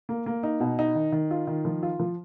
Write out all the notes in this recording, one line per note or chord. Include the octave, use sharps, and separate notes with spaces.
A#3
A#3
D#4
B2
D#4
D#3
D#3
F4
D#3
F3
F4
F3